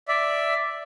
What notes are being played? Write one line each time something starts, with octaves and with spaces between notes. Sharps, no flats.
D5 E5